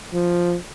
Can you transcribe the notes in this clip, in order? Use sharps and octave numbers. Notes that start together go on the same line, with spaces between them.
F3